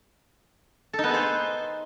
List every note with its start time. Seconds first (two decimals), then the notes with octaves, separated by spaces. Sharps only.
0.93 A4
0.99 D#4
1.04 B3
1.09 G#4
1.14 C5